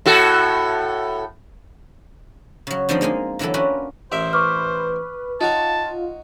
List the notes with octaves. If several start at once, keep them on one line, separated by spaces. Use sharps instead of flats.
A2 F#4 A4
C#3 F#3
D3 F3 G3 C4 D4 D#4
G#3 A#3 D#4 F4
D3 E3 F#3 E4 A4
C#4 D4 F4 F#4 A#4 B4
A1 A#4 C5 E5
B4 C#6 D6 F6
D#4 F4 F#4 C#5 A5